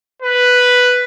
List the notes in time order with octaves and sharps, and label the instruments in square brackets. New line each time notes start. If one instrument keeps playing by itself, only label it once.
[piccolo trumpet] B4